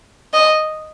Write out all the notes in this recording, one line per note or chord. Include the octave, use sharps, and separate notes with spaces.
D#5